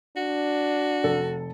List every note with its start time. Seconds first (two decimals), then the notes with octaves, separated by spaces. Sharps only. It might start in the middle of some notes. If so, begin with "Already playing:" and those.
0.17 D4 F#4
1.03 F1 A4